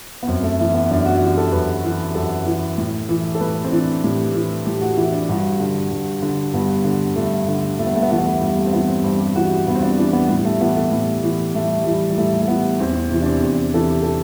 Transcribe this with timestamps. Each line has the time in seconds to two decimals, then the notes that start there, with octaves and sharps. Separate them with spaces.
0.23 B3
0.28 F#2 C4
0.43 A3
0.59 E3 A3
0.74 B3
0.91 F#2 D4
1.06 F#4
1.22 E3 G4
1.37 A4
1.52 F#2 B4
1.84 E3
2.15 F#2 A4
2.46 E3
2.78 A2
3.09 E3
3.35 A4
3.41 A2 B4
3.64 C4
3.72 E3 D4
4.03 A2 G4
4.35 E3
4.65 A2 G4
4.81 F#4
4.97 E3 E4
5.12 D4
5.29 G2 F#4
5.60 D3
5.91 G2
6.22 D3
6.54 G2 B3
6.85 D3
7.16 G2 A3
7.48 D3
7.79 G2 A3
7.87 B3
7.95 A3
8.03 B3
8.11 E3 A3
8.18 B3
8.26 A3
8.41 G2 G3
8.58 A3
8.66 C4
8.73 E3 B3
8.88 C4
9.04 G2 C4
9.20 G4
9.36 E3 F#4
9.67 G2 B3
9.75 C4
9.83 D4
9.99 E3 D4
10.13 B3
10.29 A2 G3
10.45 A3
10.61 E3 B3
10.76 A3
10.92 A2
11.23 E3
11.55 A2 A3
11.65 G3
11.83 E3 G3
12.10 G3
12.18 A2 A3
12.34 G3
12.42 A3
12.48 E3 B3
12.80 E2 C4
12.95 C4
13.11 C3 E3 C4
13.22 D4
13.26 C4
13.42 E2 C4
13.74 C3 E3 A4
13.90 G4
14.03 A4